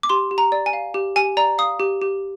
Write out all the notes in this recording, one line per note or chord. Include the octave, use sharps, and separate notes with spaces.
D6
G4 C6
G4
A#5
D5
G#5
F5
G4
G4 G#5
D5 A#5
F5 D#6
G4
G4